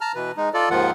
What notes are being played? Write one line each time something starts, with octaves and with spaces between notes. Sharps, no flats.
A5 A#5 F6
B2 E3 B4
G#3 D#4
F4 A4 D5
D#2 G#2 D#3 F3 F4 F#5